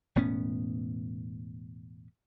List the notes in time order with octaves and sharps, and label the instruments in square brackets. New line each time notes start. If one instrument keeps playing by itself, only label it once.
[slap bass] E1 A2 B3 C#4